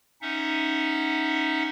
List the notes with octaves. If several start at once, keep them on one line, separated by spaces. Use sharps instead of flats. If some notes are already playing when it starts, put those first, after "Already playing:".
C#4 D#4 E5 F#5